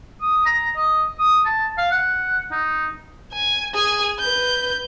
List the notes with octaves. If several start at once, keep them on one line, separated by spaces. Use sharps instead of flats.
D#6
A#5
D#5
D#6
A5
F5
F#5
D#4
G#5
G#4 G#5
B4 G6